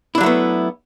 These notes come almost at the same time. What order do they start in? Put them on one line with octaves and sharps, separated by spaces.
E4 D4 F#3 A3 B3